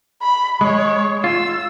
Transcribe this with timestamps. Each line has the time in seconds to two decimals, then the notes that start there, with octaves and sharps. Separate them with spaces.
0.22 B5
0.61 G#3 C#5
1.24 F4 E6